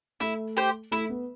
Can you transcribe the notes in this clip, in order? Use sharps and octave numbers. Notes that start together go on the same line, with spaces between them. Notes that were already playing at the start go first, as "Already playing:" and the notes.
A3 E4
G4 C5
A3 E4
B3